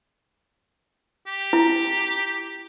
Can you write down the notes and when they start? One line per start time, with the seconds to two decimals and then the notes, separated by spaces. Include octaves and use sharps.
1.27 G4
1.53 E4